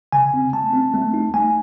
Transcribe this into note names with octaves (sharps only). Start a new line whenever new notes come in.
C#3 G#5
C4
A3 A5
C4
A3
D#4
A3 G#5